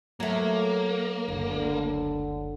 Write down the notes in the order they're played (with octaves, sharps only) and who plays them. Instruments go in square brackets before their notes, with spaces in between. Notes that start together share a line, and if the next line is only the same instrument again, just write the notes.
[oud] F#3 A3 [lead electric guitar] A#3
[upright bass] F#1 C#2 [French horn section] D3